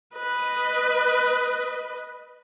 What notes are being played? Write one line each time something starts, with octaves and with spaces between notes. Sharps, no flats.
B4 D#5